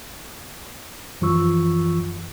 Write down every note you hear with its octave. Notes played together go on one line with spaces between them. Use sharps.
F#2 E3 F3 F4 C#6 E6